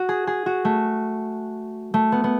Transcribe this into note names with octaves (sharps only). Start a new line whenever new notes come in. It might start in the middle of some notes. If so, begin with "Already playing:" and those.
Already playing: F#4
G#4
G#4
F#4
A3
A3
B3
B3